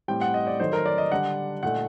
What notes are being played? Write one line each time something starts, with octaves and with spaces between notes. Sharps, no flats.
A2 G3 C4 G5
F#5
D#5
D5
D#3 F#3 A3 D#4 C5
A#4
D5
D#5
D3 G3 D4 F#5
A#2 A3 D#4 F#5